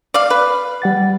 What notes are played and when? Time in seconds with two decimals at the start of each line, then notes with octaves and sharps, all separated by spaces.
0.14 D5 F5
0.30 B4
0.82 G3 F#5 A6